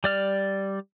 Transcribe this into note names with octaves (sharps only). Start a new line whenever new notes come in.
G3 D5 F6